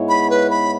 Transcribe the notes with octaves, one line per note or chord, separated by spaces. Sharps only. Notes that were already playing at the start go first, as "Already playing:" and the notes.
Already playing: G#2 G#3 B3 E4 C#5
B5
B4
B5